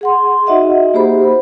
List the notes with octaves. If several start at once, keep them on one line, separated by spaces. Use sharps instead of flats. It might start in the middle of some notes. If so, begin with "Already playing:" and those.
G#4 F#5 C6
D#4 F#4 D#5 E5 F#5
A#3 G4 G#4 C5 B5